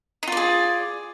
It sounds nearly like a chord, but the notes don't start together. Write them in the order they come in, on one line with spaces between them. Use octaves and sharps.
D#4 F4 D5 G#4